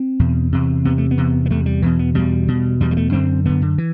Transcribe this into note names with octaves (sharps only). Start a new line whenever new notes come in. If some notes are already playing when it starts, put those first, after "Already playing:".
Already playing: C4
E2 B2
E2 C3
E2 C3 B3
A3
B3
E2 C3
B3
E2 C3 A3
G3
E2 B2 E3
B3
E2 B2 G3
E2 B2
E2 B2 G3
G3
A3
F#2 D3 C4
F#2 D3 B3
D3
E3